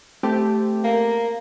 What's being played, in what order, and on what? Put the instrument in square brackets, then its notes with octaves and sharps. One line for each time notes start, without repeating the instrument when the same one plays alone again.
[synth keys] A3 C4 G4
[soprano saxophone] A#3